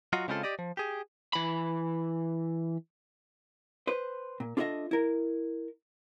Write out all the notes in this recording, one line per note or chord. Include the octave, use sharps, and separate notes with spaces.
F#3 F4 F#4 D#5
C#3 G#3 C4 E4 F4 A4
G4 D5 D#5
F3
G4 G#4
E3 B5
B4 C5
A#2
D4 F4 A4 C#5 D#5 E5
E4 A#4